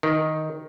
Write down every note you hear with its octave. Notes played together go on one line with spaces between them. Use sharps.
D#3